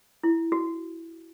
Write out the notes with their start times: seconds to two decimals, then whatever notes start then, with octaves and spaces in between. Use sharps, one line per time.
0.23 E4
0.52 F#4